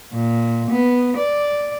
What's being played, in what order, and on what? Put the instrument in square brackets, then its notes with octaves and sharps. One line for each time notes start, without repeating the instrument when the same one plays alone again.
[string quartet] A#2
B3
D5